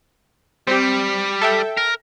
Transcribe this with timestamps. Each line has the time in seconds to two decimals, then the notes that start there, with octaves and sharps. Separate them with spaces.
0.67 G3 C4 G4
1.41 A4 E5 G5
1.77 A#4